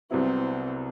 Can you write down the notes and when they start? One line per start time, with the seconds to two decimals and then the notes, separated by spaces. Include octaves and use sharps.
0.11 C2 C3 F#3 B3 C4 E4